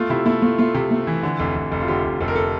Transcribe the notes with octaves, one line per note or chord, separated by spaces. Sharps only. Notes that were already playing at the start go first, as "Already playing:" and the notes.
Already playing: A3 F4
C3 E4
A3 E4
A3 F4
A3 F4
C3
A3
E3
D3
F1
F1
F1
F4
D3 G4
F1
F1 A4
A#4
A4